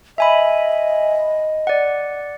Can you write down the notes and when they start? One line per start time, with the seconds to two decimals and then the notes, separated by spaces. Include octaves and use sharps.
0.18 D#5 E5 G#5 B5
1.67 D5 F#5